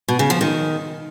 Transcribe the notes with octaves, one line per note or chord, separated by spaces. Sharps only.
B2
C#3
F3
D#3